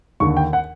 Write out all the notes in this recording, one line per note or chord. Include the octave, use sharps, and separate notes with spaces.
D#2 D3 C#6
G5
F#5